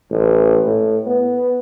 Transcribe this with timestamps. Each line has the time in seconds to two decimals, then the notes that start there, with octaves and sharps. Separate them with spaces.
0.10 A1
0.66 A2
1.06 B3